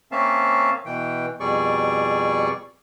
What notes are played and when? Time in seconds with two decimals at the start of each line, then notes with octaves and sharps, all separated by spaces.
0.12 A#3 C4 C#4 E5 F5 A5
0.86 B2 E3 G5
1.40 F2 B2 G3 G#4 D5 C#6